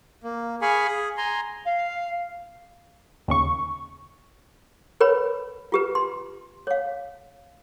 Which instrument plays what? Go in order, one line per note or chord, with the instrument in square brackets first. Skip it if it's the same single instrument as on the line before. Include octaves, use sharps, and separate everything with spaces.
[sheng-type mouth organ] A#3
G#4 F5 G#5 B5 C#6
G#4
G#5 A#5 C6
[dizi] F5
[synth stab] D#2 C#3 C#6
[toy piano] A#4 B4 C#5 B5
F4 G4 B4
C6
C#5 F5